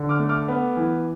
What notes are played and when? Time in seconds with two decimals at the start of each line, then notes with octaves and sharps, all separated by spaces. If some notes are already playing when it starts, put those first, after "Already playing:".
Already playing: D3
0.09 D6 F6
0.19 A3
0.29 D6 F6
0.48 B3
0.77 E3